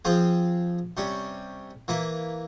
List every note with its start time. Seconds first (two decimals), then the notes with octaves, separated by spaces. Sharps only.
0.05 F3 C4 F4 G#4
0.97 C3 G3 C#4
1.88 E3 A#3 E4